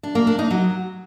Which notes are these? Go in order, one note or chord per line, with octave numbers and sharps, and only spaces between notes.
D4
A#3
D4
D#4
F#3